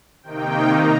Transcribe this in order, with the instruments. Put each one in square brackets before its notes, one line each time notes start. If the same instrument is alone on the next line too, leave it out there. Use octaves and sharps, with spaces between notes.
[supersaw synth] C3 D#3 A#3 D#4 G5
A#5